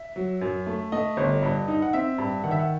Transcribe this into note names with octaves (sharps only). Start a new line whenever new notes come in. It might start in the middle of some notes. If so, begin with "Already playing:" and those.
Already playing: E5
F#3
F#2
A3
A3 D#5
G1
G2
D#4
F#5
C4 E5
G2
D#3 F#5
E5
F#5